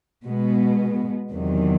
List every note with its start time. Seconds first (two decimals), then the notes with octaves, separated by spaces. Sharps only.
0.25 B2 G#3 B3
1.30 E2 C3 D#3 F#3